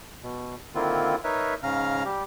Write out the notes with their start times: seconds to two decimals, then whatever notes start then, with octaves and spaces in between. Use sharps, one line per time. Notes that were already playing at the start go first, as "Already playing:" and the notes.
0.23 B2
0.75 D3 D#3 A#3 C4 E4 F4
1.24 D#4 A#4 B4 C#5 E5
1.63 G#2 C#3 C#4 F5 A#5 F6
2.05 G3 G4